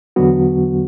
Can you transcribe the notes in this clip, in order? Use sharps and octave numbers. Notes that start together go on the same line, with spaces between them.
E2 D3 F#3 B3 F#4